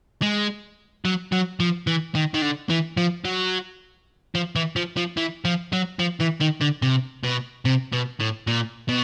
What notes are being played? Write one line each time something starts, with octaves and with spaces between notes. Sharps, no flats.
G#3
F#3
F#3
F3
E3
D#3
D#3
D3
E3
F3
F#3
F3
E3
F3
F3
E3
F3
F#3
F3
E3
D#3
D3
C3
B2
C3
B2
A2
A#2
B2